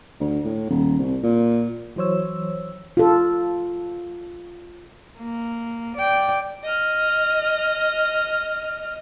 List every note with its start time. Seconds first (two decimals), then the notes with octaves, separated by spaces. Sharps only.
0.20 D2
0.45 A2
0.70 D#1
0.99 C2
1.23 A#2
1.96 E3 F#3 C5 C#5 E6
2.97 F4 A4
5.18 A#3
5.97 D5 G5
6.64 D#5 F6